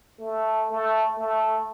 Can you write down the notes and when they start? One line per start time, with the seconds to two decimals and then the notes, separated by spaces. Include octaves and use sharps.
0.20 A3
0.71 A3
1.18 A3